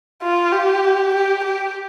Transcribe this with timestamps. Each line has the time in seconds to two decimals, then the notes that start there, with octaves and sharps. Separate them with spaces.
0.22 F4
0.52 G4
1.14 G4
1.44 G4